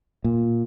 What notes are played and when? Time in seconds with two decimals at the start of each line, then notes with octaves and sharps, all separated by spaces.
0.24 A#2